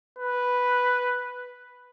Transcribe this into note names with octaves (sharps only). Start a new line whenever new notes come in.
B4